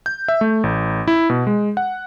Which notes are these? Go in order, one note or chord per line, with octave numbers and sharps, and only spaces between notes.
G6
E5
A3
A1
E4
B2
G#3
F#5